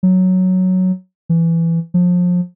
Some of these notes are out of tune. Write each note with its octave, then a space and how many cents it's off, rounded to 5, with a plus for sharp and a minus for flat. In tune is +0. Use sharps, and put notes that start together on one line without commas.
F#3 +0
E3 +15
F3 +30